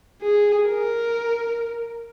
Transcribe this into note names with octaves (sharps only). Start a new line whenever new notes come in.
G#4
A#4